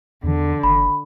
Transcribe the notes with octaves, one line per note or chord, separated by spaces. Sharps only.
E2 D3
F#1 B5